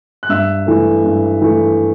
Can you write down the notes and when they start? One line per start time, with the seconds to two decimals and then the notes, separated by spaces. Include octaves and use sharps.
0.23 F#6
0.29 G2 E5 E6
0.67 E3 A3
1.04 G2
1.41 E3 A3